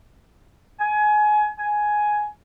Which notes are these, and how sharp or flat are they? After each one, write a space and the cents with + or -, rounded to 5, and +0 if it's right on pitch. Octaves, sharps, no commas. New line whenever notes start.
G#5 +25
G#5 +10